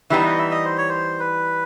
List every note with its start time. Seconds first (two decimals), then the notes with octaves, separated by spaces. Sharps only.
0.10 E3 G3 B3 D#4 E5
0.25 D#5
0.39 E5
0.51 D#5
0.65 C5
0.78 C#5
0.89 C5
1.20 B4